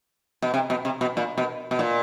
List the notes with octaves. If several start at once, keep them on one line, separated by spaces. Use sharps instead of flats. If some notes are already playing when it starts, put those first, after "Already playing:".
B2
C3
B2
C3
B2
A#2
B2
B2
A#2